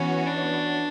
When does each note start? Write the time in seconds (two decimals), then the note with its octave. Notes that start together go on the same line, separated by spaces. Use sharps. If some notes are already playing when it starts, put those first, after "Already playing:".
Already playing: E3 B3 C#4 F#4 C#5
0.27 D4